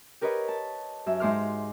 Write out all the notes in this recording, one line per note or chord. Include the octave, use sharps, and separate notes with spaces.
G4 A#4 B4 C#5 D#5
A5
F#2 E5
G#2 G#3 D#4 C5 D6 F6